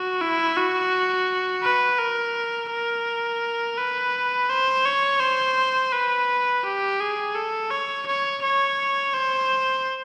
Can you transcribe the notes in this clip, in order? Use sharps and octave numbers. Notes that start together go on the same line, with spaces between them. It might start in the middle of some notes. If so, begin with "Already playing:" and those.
Already playing: F#4
E4
F#4
B4
A#4
A#4
B4
C5
C#5
C5
B4
G4
G#4
A4
C#5
C#5
C#5
C5